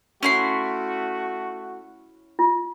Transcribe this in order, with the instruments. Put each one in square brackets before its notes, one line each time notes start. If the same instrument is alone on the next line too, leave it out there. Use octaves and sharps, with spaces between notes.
[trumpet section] A3 F#4 [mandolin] C#4 E4 C6
[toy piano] F4